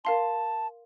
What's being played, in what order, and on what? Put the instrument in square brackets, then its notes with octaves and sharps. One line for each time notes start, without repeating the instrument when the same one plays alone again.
[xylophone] A#4 F5 C6 [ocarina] A5